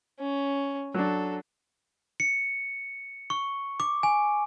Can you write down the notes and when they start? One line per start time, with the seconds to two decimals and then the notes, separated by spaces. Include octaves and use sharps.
0.19 C#4
0.94 F#3 D4 A4
2.20 C#7
3.30 C#6
3.80 D6
4.03 G#5